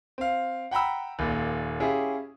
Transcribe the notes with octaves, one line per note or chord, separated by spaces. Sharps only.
C4 F5
F#5 G5 A#5 B5 E6
D#1 A#2
C#4 E4 F4 G4 G#4